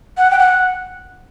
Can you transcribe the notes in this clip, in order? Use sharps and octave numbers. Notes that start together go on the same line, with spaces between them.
F#5
G5
F#5